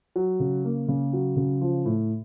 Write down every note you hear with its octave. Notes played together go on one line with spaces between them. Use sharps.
F#3
C#3
A#3
C#3
F#3
C#3
F3
A2